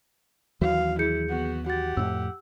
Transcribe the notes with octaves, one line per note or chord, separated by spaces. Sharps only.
D#2 E3 F#3 F#4 F5
E4 G#4 G6 C#7
B3 F#4
F#4 G4 F#5 A6
F2 A2 E6